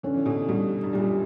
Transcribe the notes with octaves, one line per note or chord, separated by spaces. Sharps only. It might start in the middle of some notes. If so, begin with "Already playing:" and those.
D3 C#4
E3
B2 D3
G2 B2 G3
G2
F#2 A#2 G3